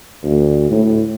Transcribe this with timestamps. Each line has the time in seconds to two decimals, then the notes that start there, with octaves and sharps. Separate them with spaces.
0.24 D2
0.71 A2